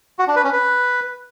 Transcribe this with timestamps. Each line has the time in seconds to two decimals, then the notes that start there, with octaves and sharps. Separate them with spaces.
0.19 F#4
0.27 D4
0.36 B4
0.44 C#4
0.53 B4